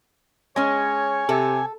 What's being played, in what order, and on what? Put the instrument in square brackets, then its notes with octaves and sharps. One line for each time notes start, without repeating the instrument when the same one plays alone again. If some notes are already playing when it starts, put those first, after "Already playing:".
[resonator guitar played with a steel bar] G#3 C#4 [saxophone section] C#5 [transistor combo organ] G#5
[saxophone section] C3 [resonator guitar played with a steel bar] A4